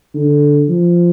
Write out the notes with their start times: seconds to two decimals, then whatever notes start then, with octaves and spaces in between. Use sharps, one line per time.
0.14 D3
0.68 F3